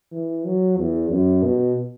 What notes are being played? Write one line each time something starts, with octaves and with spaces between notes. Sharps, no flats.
E3
F#3
E2
F#2
B2